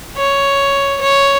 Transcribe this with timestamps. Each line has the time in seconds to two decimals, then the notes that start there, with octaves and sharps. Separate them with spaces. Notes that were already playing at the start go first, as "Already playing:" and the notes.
0.17 C#5
1.00 C#5